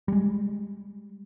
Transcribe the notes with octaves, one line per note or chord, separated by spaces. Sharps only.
G3 G#3